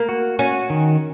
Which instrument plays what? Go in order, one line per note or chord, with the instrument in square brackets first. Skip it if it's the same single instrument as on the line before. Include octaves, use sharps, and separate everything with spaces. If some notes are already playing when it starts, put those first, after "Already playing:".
Already playing: [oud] A#3
[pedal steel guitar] F#4
[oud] C#4 [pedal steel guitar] F#4
[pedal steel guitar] D#3